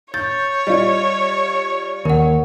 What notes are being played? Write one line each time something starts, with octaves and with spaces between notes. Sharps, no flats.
C#5 G6 A6
G3 F4 D#5
D#2 A#4 F#5